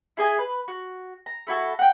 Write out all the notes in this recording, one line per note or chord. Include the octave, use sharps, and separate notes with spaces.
E4 G#4 D#5 G#5
B4
F#4
A#5
A3 E4 F#4 A4
F#5 G5